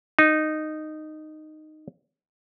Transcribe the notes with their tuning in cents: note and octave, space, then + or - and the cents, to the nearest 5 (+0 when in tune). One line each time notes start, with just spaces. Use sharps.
D#4 -10